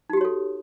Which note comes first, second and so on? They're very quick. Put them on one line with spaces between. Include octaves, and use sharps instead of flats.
D#4 G4 F#4 C#5 A4